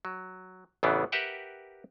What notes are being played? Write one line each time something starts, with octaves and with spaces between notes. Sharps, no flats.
F#3
A1 E2 C#3 E3 B3 D4
G4 A#4 B4 E5 F#5 G5